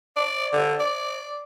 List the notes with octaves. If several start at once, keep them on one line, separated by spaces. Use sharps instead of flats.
D5
D3
D5